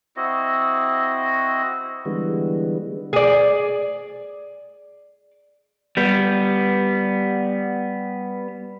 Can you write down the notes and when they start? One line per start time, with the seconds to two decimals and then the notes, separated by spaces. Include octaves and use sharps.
0.17 C4 E4 F#4 D#5
2.05 D3 E3 G3 G#3 B3
3.13 G#4 D5
5.97 G3 B3